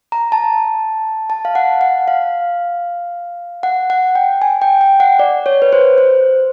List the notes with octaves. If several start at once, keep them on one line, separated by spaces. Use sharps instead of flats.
A#5
A5
A5
F5
F#5
F#5
F5
F#5
F#5
G5
G#5
G5
G5
F#5
D5
C#5
B4
C5
C5